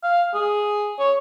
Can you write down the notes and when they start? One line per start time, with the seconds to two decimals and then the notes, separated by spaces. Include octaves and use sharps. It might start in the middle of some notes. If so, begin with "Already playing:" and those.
0.03 F5
0.34 G#4
0.99 C#5